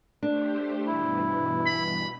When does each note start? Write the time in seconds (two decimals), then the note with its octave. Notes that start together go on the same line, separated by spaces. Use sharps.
0.23 A3 D4 G4 C5
0.87 G2 B2 E3 E4
1.67 B5